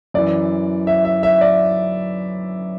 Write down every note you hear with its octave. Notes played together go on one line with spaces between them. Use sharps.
F#2 E3 D5
E5
E5
E5
D5